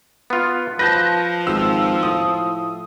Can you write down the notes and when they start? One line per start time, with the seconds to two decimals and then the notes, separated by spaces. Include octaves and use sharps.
0.30 B3 F4
0.79 F3 B4 A5 G6 A#6
1.47 G#1 E6
2.03 A2 D#6